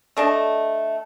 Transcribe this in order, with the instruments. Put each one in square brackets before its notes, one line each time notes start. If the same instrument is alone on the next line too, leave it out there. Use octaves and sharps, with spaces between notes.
[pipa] A3 D4 D#5 A5